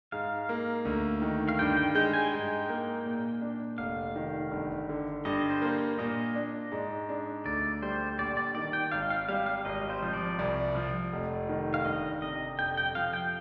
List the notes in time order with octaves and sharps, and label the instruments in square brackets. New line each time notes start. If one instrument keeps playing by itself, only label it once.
[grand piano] G#2 [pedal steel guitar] F5
[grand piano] A#3
D2
D#3
[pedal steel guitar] F5
[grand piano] G2 [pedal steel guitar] G5
[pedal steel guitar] G5
[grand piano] G#3 [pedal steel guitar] G5
[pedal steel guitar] G#5
[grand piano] G#2 [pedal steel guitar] G5
[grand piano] A#3
A#2
D4
[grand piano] F1 [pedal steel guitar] F5
[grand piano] D#3
G1
D3
[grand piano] G2 [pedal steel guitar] D#5
[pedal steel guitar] C5
[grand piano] A#3
[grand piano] A#2 [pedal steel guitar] D#5
[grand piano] D4
G#2
D4
[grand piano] D2 [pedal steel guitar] D5
[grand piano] G3 [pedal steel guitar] C5
[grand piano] A#1 [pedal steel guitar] D5
[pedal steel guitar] D5
[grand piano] D#3 [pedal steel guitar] D5
[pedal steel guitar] G5
[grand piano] G#1 [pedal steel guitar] F5
[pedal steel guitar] F5
[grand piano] G3 [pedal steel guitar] F5
[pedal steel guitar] F5
[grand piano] G#1 [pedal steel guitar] D#5
[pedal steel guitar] C5
[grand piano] F3
[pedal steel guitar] D5
[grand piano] C2
F3
F1
D#3
[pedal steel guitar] F5
[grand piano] G1 [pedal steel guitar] D#5
[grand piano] C3 [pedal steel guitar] D#5
[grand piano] F2 [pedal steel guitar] G5
[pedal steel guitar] G5
[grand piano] F3 [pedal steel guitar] F5
[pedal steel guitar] G5